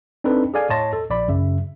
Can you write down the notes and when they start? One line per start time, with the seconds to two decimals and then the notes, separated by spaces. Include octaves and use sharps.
0.24 C4 D4 D#4 A4 B4
0.54 G#4 A4 D5 F5 G#5
0.70 A2 C#5 D#5 A5 C6 A#6
0.93 A4
1.10 A#1 D5 B5
1.28 F#2 C#3 E5